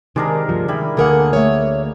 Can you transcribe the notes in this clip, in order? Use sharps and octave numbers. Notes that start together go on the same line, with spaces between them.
C3 D#3 G#3 D4 A#4
D2 G2 F3
D#3 G3 E4 B5
D2 D3 A#3 G#4 A#4 F#5
A3 C#5